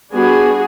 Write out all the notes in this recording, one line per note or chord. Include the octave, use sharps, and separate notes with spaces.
G3 B3 D4 F#4 G#4